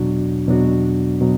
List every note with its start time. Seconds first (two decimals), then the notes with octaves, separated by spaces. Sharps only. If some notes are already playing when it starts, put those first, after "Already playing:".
Already playing: E2 B2 F#3 D4 F#4
0.48 E2 B2 F#3 D4 F#4
1.21 B2 F#3